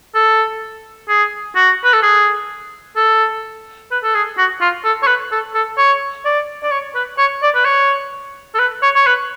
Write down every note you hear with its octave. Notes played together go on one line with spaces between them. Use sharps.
A4
G#4
F#4
B4
A4
G#4
A4
B4
A4
G#4
F#4
F4
A4
C#5
B4
A4
A4
C#5
D5
D5
C#5
B4
C#5
D5
B4
C#5
A4
B4
C#5
C#5
B4